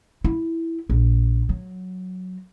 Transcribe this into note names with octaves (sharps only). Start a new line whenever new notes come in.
E4
A#1
F#3